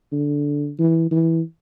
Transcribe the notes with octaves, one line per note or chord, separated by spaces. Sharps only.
D3
E3
E3